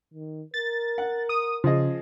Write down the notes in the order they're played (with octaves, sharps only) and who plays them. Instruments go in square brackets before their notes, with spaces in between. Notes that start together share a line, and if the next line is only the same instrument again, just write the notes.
[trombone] D#3
[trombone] A#4 [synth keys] A6
[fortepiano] F#5
[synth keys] D#6
[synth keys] C#3 [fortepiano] F3 G#4 D#5